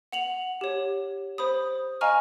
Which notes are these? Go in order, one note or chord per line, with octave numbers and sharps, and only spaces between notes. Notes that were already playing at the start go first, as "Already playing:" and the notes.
F#5 F7 F#7
G4 C#5
C5 B5 D#6
D#5 F5 G#5 A#5 C#6 F6